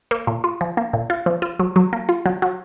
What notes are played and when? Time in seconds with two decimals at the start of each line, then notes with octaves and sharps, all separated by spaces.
0.11 A#3
0.27 A#2
0.44 F4
0.61 F3
0.77 A#3
0.93 A#2
1.10 F4
1.26 F3
1.42 F4
1.59 F#3
1.76 F#3
1.93 A#3
2.09 F4
2.26 F#3
2.42 F#3